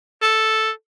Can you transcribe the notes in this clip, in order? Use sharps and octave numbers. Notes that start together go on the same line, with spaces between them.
A4